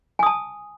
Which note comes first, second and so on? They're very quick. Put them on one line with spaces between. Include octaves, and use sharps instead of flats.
G#5 D#6 A5